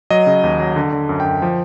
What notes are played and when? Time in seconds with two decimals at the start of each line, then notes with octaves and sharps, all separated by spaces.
0.10 F#3 D#5
0.27 C#3
0.44 D#2
0.60 F#3
0.76 D3
0.92 D3
1.09 F#2
1.20 G5
1.25 F#2
1.42 F3